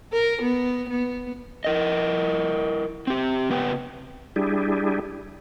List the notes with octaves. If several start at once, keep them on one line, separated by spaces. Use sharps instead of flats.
A#4
B3
B3
E4 A#4 D#5
C4 G4
C#3 B3 B4 G5
G3 D4 E4 G4 G#4